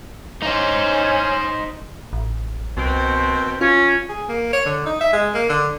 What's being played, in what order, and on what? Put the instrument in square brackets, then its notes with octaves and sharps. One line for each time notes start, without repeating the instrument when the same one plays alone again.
[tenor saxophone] C#4 [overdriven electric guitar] D#4 C5
[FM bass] A1
[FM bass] C2 [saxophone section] B2 D#3 C4
[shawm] C#4 [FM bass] F4
[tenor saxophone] G#4
A#3
C#5
D3
D#4
E5
G#3
A#3
D3